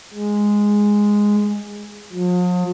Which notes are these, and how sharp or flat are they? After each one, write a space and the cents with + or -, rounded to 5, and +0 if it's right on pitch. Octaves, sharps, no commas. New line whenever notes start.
G#3 -5
F3 +45